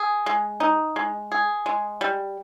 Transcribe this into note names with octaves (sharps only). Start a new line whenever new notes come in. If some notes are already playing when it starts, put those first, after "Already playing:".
Already playing: G#4
G#3
D#4
G#3
G#4
G#3
G3